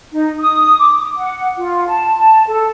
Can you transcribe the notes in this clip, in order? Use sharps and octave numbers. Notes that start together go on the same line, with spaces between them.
D#4
D#6
D6
F#5
F4
A5
A4